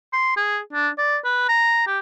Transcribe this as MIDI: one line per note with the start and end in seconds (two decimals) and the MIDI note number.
0.13 0.33 84
0.37 0.59 68
0.73 0.89 62
0.98 1.17 74
1.24 1.44 71
1.49 1.86 82
1.87 1.99 67